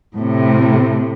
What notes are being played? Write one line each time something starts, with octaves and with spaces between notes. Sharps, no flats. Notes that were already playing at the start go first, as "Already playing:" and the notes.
A2 C3